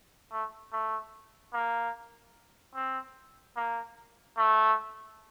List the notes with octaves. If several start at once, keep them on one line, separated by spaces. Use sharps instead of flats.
A3
A3
A#3
C4
A#3
A3